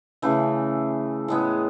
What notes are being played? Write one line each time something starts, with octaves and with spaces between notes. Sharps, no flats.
C#3 E3 A3
A2 G#3 B3